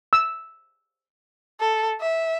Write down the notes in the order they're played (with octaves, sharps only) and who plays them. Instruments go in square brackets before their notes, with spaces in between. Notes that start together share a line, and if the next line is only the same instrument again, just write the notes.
[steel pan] E6
[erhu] A4
E5